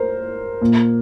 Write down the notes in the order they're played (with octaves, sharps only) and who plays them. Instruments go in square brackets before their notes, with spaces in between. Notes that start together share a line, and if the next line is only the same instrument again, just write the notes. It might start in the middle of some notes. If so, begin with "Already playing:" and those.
Already playing: [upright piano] A#4 C5
A#2